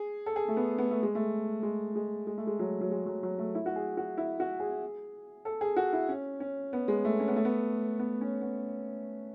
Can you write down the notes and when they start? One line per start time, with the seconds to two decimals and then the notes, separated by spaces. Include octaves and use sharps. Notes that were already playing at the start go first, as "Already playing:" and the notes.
Already playing: G#4
0.26 A4
0.36 G#4
0.48 A3
0.57 B3
0.78 B3
0.91 A3
1.03 G#3
1.15 A3
1.63 G#3
1.95 G#3
2.27 G#3
2.38 A3
2.47 G#3
2.59 F#3
2.81 F#3
2.91 G#3
3.06 F#3
3.23 F#3
3.39 A3
3.55 E4
3.66 F#4
3.76 G#4
3.97 F#4
4.18 E4
4.40 F#4
4.60 G#4
5.45 A4
5.61 G#4
5.76 F#4
5.93 E4
6.09 C#4
6.40 C#4
6.73 B3
6.88 G#3
7.05 A3
7.20 C#4
7.28 B3
7.36 A3
7.45 B3
7.99 B3
8.21 C#4
8.42 B3